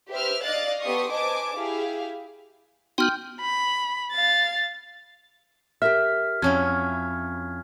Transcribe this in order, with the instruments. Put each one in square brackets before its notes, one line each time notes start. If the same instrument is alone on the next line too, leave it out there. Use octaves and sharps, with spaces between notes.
[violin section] G4 B4 C5 E5 F6
D5 D#5 F5 F#6 A6
B3 G4 A4 C6 C#6 D#6
B4 C5 D#5 G#5 A5 D6
E4 G4 G#4 F5
[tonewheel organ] B3 D#4 F#4 [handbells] G5 G6 [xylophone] C6 F6
[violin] B5
F5 A6
[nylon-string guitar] G4 A#4 E5 [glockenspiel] F6 B6
[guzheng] F2 C#4 E4 [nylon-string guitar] F#4 [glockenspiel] G#6